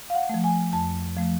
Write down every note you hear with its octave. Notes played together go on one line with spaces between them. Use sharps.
F5
F#5
F3 A3
G#5
F2 A5
F3 A3